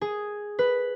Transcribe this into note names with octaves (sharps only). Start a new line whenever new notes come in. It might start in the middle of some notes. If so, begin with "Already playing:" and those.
G#4
B4